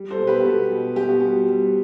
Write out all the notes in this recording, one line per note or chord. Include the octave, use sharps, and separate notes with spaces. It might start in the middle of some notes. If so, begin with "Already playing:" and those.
Already playing: G3
A4 C5
B2
G4 B4
B2 F#4 A4
B2
B2 G4
F#4
G3 G4
G3